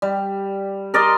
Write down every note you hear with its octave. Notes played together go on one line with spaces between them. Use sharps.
G3
A#4 D5 D#5 C6